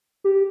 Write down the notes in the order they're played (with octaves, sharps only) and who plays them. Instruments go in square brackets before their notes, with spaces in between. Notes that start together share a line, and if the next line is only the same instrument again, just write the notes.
[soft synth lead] G4